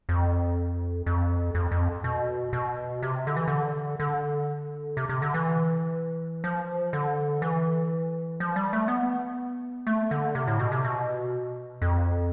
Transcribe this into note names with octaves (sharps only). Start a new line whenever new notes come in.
F2
F2
F2
F2
B2
B2
C3
D3
E3
D3
D3
C3
C3
D3
E3
F3
D3
E3
F3
G3
A3
B3
A3
D3
C3
A2
B2
C3
B2
F2